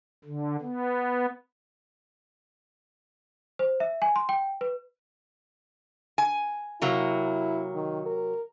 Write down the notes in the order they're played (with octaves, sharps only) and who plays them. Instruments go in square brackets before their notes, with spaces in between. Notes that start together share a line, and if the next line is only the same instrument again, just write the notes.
[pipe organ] D3
B3
[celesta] C5
E5
G#5
C6
G5
B4
[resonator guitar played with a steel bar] G#5
[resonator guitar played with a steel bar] C3 F#3 A#3 [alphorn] E4
[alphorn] D#3
A#4